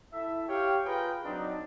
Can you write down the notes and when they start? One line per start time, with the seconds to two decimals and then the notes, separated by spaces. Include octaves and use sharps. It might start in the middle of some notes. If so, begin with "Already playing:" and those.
0.13 E4 A4 E5
0.48 G4 C#5 F5 G5
0.85 F4 G#4 A#4 B4 G5
1.25 F#3 C4 D4 D#4